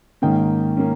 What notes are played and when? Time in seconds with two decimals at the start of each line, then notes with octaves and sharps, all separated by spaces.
0.22 G#2 D#3 A#3 C#4 G5
0.77 A#3 C#4